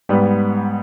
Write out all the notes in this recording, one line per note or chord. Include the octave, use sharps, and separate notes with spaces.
G#2 G3 B3